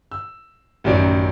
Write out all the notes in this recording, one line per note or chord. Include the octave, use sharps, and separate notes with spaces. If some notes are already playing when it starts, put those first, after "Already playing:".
E6
A1 F#2 D#3 F#3 D5